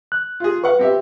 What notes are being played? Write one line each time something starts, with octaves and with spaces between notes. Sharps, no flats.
F#6
F4 G#4
B4 F5 F#5 C#6
C4 G4 E5